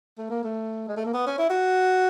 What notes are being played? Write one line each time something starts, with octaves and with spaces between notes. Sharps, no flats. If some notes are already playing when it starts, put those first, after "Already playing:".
A3
A#3
A3
G#3
A3
A#3
B3
C#4
E4
F#4